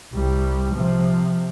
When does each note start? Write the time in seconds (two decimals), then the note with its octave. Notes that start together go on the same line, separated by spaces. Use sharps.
0.14 C2 G3
0.74 C3 F3